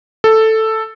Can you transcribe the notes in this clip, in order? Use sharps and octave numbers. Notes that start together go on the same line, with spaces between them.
A4